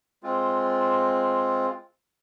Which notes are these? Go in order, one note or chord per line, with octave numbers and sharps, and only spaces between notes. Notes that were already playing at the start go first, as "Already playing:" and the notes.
G#3 C4 F4